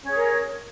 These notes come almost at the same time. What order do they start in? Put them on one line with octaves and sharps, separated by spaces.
C#4 C#5 G#4 A#4